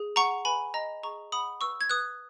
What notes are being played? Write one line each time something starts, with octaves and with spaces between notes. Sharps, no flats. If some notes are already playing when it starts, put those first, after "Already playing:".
Already playing: G#4
F#5 A#5 C#6
B4 G#5 B5
D#5 A#5
G#4 A#5 C#6
F#5 B5 D#6
B4 C#6 E6
G#6
B4 D#6 F#6